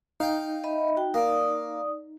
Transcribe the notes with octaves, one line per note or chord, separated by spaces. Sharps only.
D#4 F5 G5
D#5 E5 B5
F#4 G5
A#3 D5 D#6